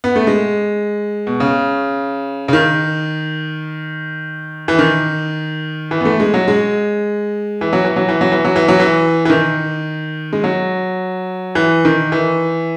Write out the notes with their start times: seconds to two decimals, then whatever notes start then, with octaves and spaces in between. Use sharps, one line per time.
0.04 B3
0.16 A3
0.27 G#3
1.27 B2
1.40 C#3
2.48 C#3
2.53 D#3
4.68 E3
4.79 D#3
5.91 E3
6.01 B3
6.05 A3
6.20 G#3
6.34 F#3
6.48 G#3
7.61 E3
7.73 F#3
7.85 E3
7.96 F#3
8.09 E3
8.21 F#3
8.32 E3
8.45 F#3
8.56 E3
8.68 F#3
8.80 E3
9.25 E3
9.30 D#3
10.33 G#3
10.44 F#3
11.55 E3
11.85 D#3
12.12 E3